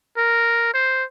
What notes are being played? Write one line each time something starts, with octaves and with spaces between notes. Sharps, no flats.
A#4
C5